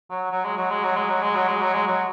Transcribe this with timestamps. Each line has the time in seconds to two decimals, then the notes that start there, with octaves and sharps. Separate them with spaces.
0.10 F#3
0.31 F#3
0.45 G#3
0.58 F#3
0.70 G#3
0.84 F#3
0.96 G#3
1.09 F#3
1.22 G#3
1.35 F#3
1.48 G#3
1.61 F#3
1.74 G#3
1.87 F#3